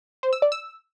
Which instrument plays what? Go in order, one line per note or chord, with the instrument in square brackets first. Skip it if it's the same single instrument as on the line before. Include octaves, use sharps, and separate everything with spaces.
[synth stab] C5
E6
D5
E6